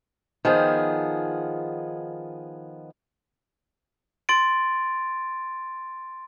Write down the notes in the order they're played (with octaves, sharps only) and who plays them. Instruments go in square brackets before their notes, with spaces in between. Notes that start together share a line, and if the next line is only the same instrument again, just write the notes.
[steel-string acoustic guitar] D#3 F3 B3 G#4
[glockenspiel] C6 A6 D7